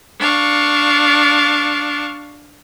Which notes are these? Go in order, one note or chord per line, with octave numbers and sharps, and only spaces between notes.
D4 F5 C#6